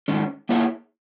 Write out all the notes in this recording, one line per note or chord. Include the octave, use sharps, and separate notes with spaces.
G#2 D#3 G#3 C#4
A#3 E4 G#4 C#5 E5